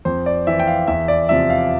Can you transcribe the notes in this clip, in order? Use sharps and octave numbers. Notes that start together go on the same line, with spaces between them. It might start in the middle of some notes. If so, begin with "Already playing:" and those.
F2 C5
D5
E3 E5
G5
F5
E2 E5
D5
C3 F3 E5
F5